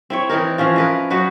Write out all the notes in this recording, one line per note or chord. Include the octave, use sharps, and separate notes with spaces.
C4 E4 C#5
E3 C4 D#4 A#4
E3 F3 C#4 F4
A#4 B4 D#5
F#3 D#4 F#4 B4